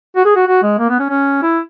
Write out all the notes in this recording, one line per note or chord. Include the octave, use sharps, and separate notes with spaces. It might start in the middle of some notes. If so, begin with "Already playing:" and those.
F#4
G#4
F#4
F#4
G#3
A#3
B3
C#4
C#4
E4